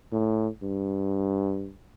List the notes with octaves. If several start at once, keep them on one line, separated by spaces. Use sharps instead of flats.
A2
G2